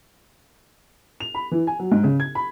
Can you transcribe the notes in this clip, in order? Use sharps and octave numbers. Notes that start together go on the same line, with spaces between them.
F7
B5
E3
G#5
F#3
G#2
C#3
G#6
B5